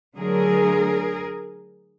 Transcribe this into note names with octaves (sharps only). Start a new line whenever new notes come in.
D3 F#3 A3 G#4 A#4